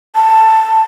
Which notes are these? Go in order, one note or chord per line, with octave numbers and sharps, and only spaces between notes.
A5